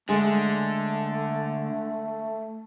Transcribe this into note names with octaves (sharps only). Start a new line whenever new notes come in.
D3 G#3 A3 G#5 C6